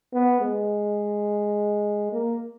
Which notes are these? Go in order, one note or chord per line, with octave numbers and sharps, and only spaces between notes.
B3
G#3
A#3